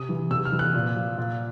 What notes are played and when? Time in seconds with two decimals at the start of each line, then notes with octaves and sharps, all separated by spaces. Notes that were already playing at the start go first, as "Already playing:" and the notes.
Already playing: C3 D#6
0.09 E3
0.31 C3 E6
0.45 F6
0.52 E3
0.59 F#6
0.74 A#2
0.96 F3
1.18 A#2